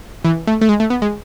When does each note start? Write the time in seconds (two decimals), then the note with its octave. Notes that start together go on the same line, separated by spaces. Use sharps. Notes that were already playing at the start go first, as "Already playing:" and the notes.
0.25 E3
0.47 A3
0.61 A3
0.69 G#3
0.80 A3
0.90 B3
1.02 G#3